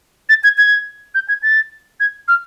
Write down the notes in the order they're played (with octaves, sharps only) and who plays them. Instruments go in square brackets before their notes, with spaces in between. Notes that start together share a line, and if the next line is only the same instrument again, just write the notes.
[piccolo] A6
G#6
G#6
G6
G#6
A6
G#6
F6